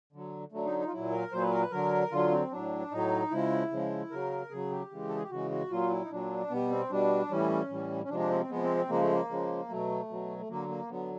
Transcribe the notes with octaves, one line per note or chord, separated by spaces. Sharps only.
D3 F#3
D3 F#3 A3
D#4
D#4
F4
A#2 F#3 E4
A#4
A#2 F#3 C5
B4
A#4
B4
D3 F#3 A#4
D3 F#3 F4
C4
A2 F#3 D4
A2 F#3 D#4
C#3 F3 G#3 E4
C#3 F3 G#3
C#3 F#3 A#4
C#3 F#3 G#4
G4
C#3 E3 G#3
A4
G#4
G4
C#3 E3 G#3 F#4
F#4
A#2 F#3 F4
E4
D#4
A#2 F#3 D4
B2 G3 B3
C4
B2 G3 D4
A2 E3 G3 C#4
A2 E3 G3
C#4
C3 F3 G#3 D4
D4
C4
C#4
C4
C3 F3 G#3 B3
C4
C4
C#3 F3 G#3 A#3
A3
A#3
C#3 F3 G#3
B2 F#3 A3
B2 F#3
A3
D3 F#3 A#3
A#3
D3 F#3 B3